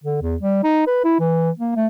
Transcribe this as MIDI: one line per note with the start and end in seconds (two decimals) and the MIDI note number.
0.04 0.20 50
0.22 0.36 40
0.42 0.60 55
0.63 0.86 63
0.87 1.02 71
1.04 1.16 64
1.20 1.50 52
1.59 1.75 58
1.76 1.87 57